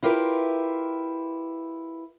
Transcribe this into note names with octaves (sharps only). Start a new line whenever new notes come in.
E4 F4 G4 A#4 B4